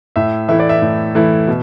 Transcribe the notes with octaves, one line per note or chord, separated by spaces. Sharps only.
A2 E5
E3 A3 E4 E5
D5
E5
A2
E3 A3 E4
B2